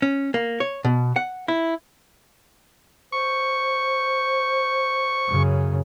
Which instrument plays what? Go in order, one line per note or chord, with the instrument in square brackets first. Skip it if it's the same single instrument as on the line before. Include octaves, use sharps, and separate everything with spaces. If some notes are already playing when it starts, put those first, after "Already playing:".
[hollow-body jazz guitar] C#4
A#3
C#5
B2
F#5
E4
[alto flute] C5 [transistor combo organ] C#6
[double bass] F#2 C#3